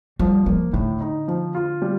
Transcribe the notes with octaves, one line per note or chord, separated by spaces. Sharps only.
F3 G3
F3 A#3
A2 D3
D#4
F3
F4
G3